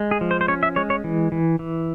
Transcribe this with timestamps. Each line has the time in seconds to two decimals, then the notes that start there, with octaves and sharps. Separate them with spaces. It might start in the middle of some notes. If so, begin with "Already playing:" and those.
Already playing: G#3
0.11 G#4
0.21 F3
0.31 C5
0.41 C5
0.48 C#4 C#5
0.63 E5
0.76 G#3 C#5
0.90 C#5
1.04 E3
1.32 E3
1.59 E3